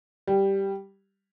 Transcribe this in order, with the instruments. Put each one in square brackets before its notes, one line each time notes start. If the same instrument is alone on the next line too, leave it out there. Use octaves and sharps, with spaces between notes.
[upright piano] G3